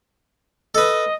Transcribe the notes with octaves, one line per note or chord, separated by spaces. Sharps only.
A4 B4 D#5